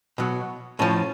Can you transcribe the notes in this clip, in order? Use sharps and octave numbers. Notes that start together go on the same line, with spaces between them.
B2 F#3
A2 F3 C#4